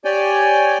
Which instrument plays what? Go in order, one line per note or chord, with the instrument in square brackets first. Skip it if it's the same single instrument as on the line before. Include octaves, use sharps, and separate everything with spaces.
[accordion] G4 C#5 D5 G5 G#5